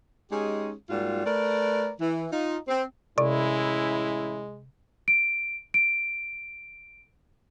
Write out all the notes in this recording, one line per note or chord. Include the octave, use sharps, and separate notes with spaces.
G#3 C#4 D#4 G4 G#4
G#2 G3 A#3 F4 F#4
A3 A#4 B4 D5
E3
D#4 F4
C4
A1 C3 G#3 C#4 E4 D5
D7
D7